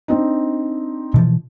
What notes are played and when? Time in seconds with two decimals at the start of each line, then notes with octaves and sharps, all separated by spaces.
0.08 C4 D4 D#4
1.14 B2 E3 F3